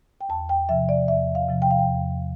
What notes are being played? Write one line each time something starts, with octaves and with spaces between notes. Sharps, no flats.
G5
E2 A5
G5
C3 F3 E5
D5
E2 E5
F5
C3 F3
G5
F5
G5
E2